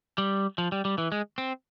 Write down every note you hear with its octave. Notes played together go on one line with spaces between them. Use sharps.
G3
F3
G3
G3
E3
G#3
C4